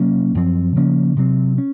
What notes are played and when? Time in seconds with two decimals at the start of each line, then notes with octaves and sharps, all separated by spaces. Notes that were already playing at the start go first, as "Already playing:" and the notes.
Already playing: C3 F#3 A#3 C#4
0.35 F#2 F3 C4
0.76 C#3 F3 A#3 C#4
1.16 C3 F#3 C4
1.58 C#4